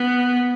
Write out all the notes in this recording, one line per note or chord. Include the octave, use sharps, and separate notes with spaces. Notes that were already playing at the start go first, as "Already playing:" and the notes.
Already playing: B3